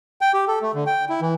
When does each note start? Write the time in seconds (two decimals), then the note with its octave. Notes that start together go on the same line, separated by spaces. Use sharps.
0.21 G5
0.34 G4
0.48 A4
0.62 A3
0.75 D3
0.86 G5
1.09 E4
1.21 E3